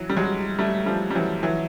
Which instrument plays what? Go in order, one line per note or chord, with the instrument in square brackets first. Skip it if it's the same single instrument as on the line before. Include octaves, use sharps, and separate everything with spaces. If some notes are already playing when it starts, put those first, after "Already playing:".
Already playing: [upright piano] E3 F#3
G3
F#3 G#3
G3 A3
F3 G3
G3
E3 F#3
E3 F#3